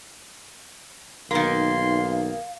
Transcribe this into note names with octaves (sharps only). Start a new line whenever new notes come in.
B1 D#3 A#3 F5 C6